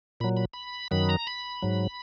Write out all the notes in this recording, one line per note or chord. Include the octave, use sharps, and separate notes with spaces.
A#2 F#3 B5
B5
B5
F#2 D#3 F#3 B5
A#5
B5
G#2 F#3